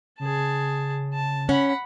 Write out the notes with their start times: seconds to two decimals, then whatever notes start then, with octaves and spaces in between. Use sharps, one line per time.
0.20 C#3 G#4 A5
1.13 A5
1.49 C#4 F#5 B5